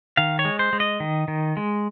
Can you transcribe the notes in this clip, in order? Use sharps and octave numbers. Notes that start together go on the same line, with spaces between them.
D#3 F5
C#5
G#3
C5
G#3
D#5
D#3
D#3
G#3